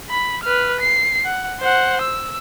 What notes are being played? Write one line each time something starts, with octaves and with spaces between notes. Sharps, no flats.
B5
B4 F6
C7
F#5
C5 F#5
E6